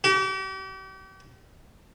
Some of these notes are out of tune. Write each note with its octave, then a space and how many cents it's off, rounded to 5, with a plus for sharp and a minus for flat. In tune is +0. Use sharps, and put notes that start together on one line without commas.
G4 -40